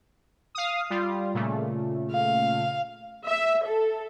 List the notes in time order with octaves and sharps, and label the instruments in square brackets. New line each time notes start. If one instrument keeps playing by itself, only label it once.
[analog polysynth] F5 D#6
G3 F4
A#2 C#3 A3
[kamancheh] F5
[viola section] E5
A4